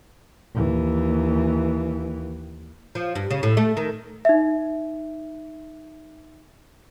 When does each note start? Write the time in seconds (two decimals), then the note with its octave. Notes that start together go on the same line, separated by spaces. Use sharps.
0.54 D#2 E3
2.95 F3
3.15 G2
3.31 C#3
3.43 A2
3.57 A3
3.77 D#3
4.25 D#4 E5